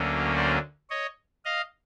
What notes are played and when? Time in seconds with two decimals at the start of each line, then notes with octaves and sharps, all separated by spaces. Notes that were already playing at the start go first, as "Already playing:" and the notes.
Already playing: D2 D3 F#3 A#3 C#4
0.36 C5 D5
0.90 C#5 D#5
1.45 D#5 F5